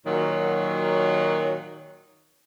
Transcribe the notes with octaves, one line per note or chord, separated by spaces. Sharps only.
A#2 D#3 F#3